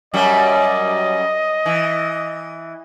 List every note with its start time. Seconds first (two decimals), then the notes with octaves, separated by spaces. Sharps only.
0.14 F#2 F#3 G3 D#5
1.66 E3